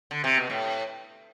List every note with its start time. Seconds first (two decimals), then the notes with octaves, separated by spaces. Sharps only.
0.11 D3
0.24 C3
0.37 B2
0.50 A2